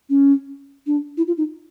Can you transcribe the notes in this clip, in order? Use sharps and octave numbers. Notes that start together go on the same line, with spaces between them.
C#4
D4
E4
F4
D#4